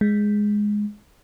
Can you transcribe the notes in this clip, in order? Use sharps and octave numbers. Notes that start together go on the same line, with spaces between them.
G#3